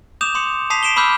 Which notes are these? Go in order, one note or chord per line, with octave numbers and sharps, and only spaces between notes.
D6 D#6 G6 E7 F7
C6 D#6 C#7
A5 D#6 B6 C7 F7
B6 C7 D7 E7 F7 G7
B5 D6 E6 F6 G6